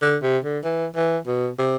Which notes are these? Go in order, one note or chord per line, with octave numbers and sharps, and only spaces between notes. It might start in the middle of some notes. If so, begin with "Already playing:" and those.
D3
C3
D3
E3
E3
B2
C3